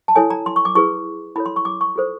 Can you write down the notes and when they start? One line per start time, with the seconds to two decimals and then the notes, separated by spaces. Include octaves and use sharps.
0.08 A5
0.16 E4 A4 C#5 G#5
0.30 A#5
0.46 C6
0.56 C#6
0.65 D6
0.75 E4 G#4 B4 C#6
1.36 E4 A4 C#5 B5
1.46 C6
1.56 C#6
1.65 D6
1.81 C#6
1.96 F4 A4 C5